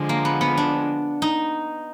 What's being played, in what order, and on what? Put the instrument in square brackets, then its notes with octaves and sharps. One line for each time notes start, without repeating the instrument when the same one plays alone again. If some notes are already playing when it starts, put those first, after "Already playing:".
Already playing: [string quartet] D3 F3 G#3
[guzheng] A#3
B3
B3
D4
D#4